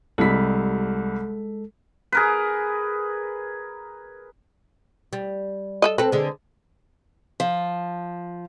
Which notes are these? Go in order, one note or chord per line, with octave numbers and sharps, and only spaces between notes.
C2 G3 G#3 A4 B6
G#4 A#4 B4
G3
A4 B4 D#5
C4 A4 B4
D3 G#3
F3